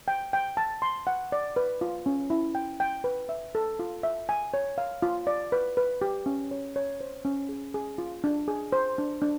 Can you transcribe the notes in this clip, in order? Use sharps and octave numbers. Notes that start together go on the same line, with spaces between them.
G5
G5
A5
C6
F#5
D5
B4
F4
C#4
E4
G5
G5
B4
E5
A4
F4
E5
G#5
C#5
F5
F4
D5
B4
B4
G4
C#4
C#5
C#5
C5
C#4
G#4
G#4
F4
D4
G#4
C5
D4
D4